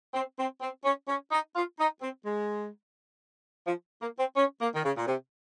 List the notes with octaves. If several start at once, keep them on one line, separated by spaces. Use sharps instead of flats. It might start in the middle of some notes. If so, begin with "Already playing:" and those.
C4
C4
C4
C#4
C#4
D#4
F4
D#4
C4
G#3
F3
A#3
C4
C#4
A#3
D#3
C#3
A#2
C3